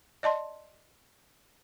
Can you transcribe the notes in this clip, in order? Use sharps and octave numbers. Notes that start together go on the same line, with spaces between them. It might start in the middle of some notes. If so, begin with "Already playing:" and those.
D5 D#5 A5 C6